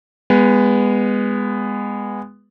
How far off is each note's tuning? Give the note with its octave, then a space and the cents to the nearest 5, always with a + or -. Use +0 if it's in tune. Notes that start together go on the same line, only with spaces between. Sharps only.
G#3 -20 B3 +0